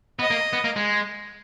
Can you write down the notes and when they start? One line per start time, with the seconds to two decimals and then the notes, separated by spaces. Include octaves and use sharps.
0.19 B3 D#5
0.31 A#3
0.53 B3
0.64 A#3
0.76 G#3